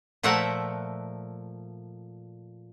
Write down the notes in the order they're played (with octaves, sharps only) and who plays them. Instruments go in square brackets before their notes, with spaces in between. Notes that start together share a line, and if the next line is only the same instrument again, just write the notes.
[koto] A#2 F3 A3 A#4 E5 F#5